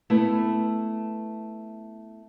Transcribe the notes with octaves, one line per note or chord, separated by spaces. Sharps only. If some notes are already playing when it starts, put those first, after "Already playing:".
A3 B3 E4 B4